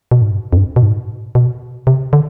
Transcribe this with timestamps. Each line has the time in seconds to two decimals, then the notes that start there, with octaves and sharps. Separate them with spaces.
0.11 B2
0.22 G#2
0.31 G2
0.53 F2
0.57 G2
0.76 B2
0.83 G#2
1.35 B2
1.87 C3
2.13 D3